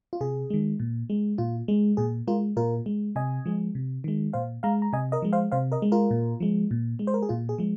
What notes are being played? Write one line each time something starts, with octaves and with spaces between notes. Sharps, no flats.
F4
C3 G#4
D#3 G#3
A#2
G#3
A#2 F4
G#3
A#2 G#4
G#3 F4 A#4
A#2 F4 A#4
G#3
C3 D#5 G#5
F3 G#3
C3
D#3 G#3
A#2 C5 F5
G#3 F5 A#5
A#5
C3 D#5 G#5
A#4 D#5
F3 G#3
C5 F5
C3 C5 F5
A#4 D#5
G#3
F4 A#4
A#2
F3 G#3
A#2
G#3
C5
A#4
G#4
A#2 F4
G#4
F3 G#3